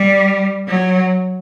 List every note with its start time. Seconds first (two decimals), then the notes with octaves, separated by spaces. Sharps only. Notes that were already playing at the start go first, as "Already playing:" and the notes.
Already playing: G3
0.67 F#3